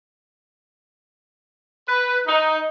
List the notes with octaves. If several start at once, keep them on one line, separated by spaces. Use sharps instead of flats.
B4
D#4